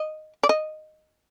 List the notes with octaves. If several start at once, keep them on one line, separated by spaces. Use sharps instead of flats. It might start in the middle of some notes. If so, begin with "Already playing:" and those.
Already playing: D#5
D5
D#5